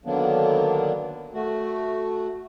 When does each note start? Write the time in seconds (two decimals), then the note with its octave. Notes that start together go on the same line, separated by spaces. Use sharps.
0.05 D3 D#3 F#3 A#3 B3 D4
1.34 A3 F#4